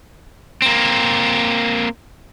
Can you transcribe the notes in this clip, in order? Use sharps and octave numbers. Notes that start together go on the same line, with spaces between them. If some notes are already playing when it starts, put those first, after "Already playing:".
A#3 C4